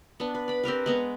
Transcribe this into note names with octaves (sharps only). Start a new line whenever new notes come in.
B3 D4
B4
D5 B5
C4 G4 A#4 B4
G#3 B3 A#5